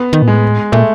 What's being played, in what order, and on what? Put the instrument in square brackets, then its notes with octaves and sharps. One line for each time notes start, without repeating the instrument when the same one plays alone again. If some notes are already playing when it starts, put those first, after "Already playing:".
Already playing: [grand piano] B3
[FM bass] D#3
A#2
[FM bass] A2 [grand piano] G#3
[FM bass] A#2 [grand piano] A3